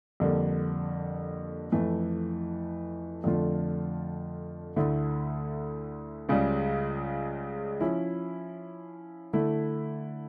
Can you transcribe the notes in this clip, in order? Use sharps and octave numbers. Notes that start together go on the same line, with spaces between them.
F2 D3 G3 A#3
F2 E3 A3
F2 D3 A3 D4 F4
D2 D3 A3 E4
C#2 C#3 G3
F3 C#4 E4
D3 A3 E4